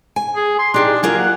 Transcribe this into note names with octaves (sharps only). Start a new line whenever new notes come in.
G#5
G#4
C6
D4 D#4 G4 G#4
F#3 A#3 F4 G#5
F#5